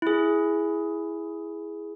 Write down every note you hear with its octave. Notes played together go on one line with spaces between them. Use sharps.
E4 G#4